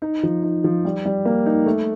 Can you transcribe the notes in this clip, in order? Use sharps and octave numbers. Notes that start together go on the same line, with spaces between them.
D#4
F3
D#4
F3
G3
G3
A#3
D#4
A3